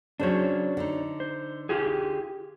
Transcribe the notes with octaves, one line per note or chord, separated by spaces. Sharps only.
C#3 F#3 D4 C5 C#5
D3 D#4
C5
F4 G4 G#4